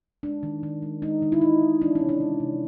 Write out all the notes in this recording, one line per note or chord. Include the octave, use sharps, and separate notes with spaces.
G#3 D4
D#3
D#3
G#3
G#3 D#4
D#3
E4
D#3 D#4
G#3
E3 D4
C#4
C3
D4
G#3
C3